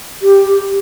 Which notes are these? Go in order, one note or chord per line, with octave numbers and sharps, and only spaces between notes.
G4